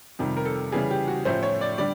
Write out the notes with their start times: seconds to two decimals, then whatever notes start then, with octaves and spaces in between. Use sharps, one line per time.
0.19 F2 C3 D#3 G3
0.37 A#4
0.45 A4
0.72 C#3 E3 G3 G#4
0.91 G4
1.08 F#4
1.25 A2 F3 A3 C#4 C5
1.43 C#5
1.61 D5
1.78 D3 G3 D5